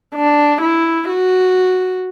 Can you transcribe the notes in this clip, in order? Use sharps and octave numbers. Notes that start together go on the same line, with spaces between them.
D4
E4
F#4